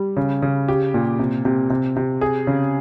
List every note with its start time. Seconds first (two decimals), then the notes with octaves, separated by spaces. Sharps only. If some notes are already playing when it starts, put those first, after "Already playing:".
Already playing: G3
0.17 C#3
0.42 C#3
0.68 G4
0.94 A#2
1.19 C3
1.45 C3
1.70 C3
1.96 C3
2.21 G#4
2.47 C#3